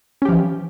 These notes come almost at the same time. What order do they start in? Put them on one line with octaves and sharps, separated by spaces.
C#4 G4 F3 E3